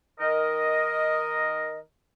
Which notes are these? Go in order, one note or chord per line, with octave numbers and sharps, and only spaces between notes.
D#3 A#4 D#5